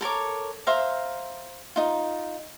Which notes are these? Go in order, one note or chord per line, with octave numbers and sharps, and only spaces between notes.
A4 A#4 C#5 D6
C5 E5 F5 A#5
D#4 F4